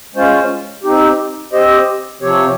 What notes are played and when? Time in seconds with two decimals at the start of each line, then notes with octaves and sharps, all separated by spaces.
0.15 G#3 C#4 F4 C5
0.84 C4 D#4 G4
1.53 C4 G4 C5 D#5
2.21 C3 F3 C4 G4 C#5